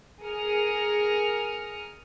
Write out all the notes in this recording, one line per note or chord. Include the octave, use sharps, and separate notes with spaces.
G#4 A#4 D#6 F6 C#7